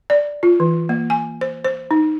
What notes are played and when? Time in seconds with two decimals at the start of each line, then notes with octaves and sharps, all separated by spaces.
0.10 D5
0.43 F4
0.60 E3
0.89 A#3
1.10 G#5
1.41 C5
1.65 C5
1.91 D#4